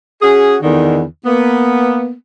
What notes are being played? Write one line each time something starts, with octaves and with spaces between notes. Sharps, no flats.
C#4 F#4 G#4
E2 D3 D#3
A#3 B3